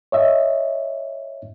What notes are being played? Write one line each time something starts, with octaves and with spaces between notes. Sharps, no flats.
C#5 D#5 E5